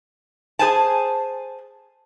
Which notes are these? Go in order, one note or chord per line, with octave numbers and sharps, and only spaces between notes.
G#4 C5 G#5 A5